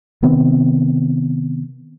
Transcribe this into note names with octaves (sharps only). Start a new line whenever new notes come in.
C3 D#3 B3 C4